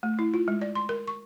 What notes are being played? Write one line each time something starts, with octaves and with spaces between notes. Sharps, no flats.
A3
E4
F4
G#3
D5
C6
A#4
C#6